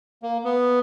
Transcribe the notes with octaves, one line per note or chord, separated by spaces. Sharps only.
A#3
B3